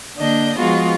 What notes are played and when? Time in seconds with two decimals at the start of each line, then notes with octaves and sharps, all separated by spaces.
0.17 D3 A#3 D4 D#5 G6
0.57 F3 G#3 B3 F4 F#4